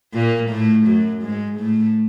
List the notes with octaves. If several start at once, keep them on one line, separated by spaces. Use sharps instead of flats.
A#2 A#3
A2 A3
F#2 F#3
G#2 G#3
A2 A3